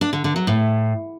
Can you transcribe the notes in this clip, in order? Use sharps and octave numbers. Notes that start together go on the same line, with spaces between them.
D4
D3
D3
F#3
A2